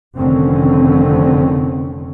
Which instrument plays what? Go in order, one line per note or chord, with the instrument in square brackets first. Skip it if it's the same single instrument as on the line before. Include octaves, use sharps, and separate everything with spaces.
[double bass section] F1 F2 D3 D#3 C4 C#4